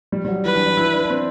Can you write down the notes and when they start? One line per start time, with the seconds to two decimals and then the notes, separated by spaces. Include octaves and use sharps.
0.12 G3
0.25 G3
0.28 F#3
0.45 E3 B4
0.55 D4
0.66 D4
0.77 E4
0.94 D4
1.04 D4
1.10 C4